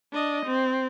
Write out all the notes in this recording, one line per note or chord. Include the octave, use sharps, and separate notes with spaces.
D4 D#5
C4